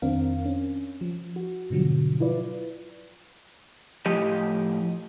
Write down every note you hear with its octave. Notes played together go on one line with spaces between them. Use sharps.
F2 D#3 C4 D4 A#4 F5
C#4
F3
F#4
G#2 B2 D3 F3 F#3
E4 F4 B4 D5
A2 F3 G4 D#5